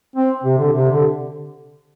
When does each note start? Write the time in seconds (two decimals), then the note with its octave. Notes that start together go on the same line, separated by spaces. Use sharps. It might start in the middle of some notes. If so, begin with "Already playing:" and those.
0.16 C4
0.44 C3
0.58 D3
0.72 C3
0.91 D3